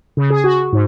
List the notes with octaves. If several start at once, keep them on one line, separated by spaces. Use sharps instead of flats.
C#3
G#4
F#4
G#2